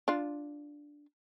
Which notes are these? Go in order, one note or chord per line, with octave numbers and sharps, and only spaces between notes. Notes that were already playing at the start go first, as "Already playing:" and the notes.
D4 F4